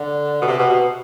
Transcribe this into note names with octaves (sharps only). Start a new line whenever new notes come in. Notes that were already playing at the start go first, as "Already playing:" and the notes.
Already playing: D3
B2
C3
B2
B2